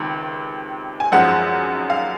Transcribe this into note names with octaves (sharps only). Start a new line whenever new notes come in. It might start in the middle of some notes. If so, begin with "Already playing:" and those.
Already playing: C#2 C3 D#3
G#5
G#1 F#2 F3 G#3 F#5
F5